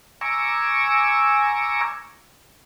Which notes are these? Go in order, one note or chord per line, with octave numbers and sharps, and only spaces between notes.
G#5 A#5 C#6 D6 E6